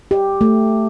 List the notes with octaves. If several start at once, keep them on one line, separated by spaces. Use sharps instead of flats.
G4
A3